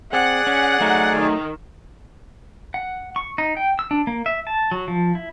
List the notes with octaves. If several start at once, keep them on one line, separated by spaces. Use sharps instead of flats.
C4 G#4 D5 F#5
C#4
F#3 A3 D#4
D#3
F#5
C#6
D#4
G5
E6
D4
A#3
E5
A5
F#3
F3
E4